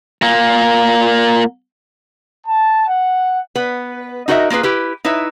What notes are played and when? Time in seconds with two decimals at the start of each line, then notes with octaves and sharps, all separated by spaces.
0.22 A#2 A#3
2.45 A5
2.87 F#5
3.55 B3 B4
4.28 D#4 F#4 A#4 C5 D#5 E5
4.50 A#3 F4 G#4 B4
4.63 E4 G4 B4
5.05 D#4 E4 B4 C#5 E5